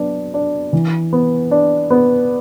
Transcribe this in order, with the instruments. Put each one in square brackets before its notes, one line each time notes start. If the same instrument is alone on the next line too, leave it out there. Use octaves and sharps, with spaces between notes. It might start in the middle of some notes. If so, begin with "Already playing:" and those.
Already playing: [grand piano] F#3 B3 D4
D4
E3
B3
D4
B3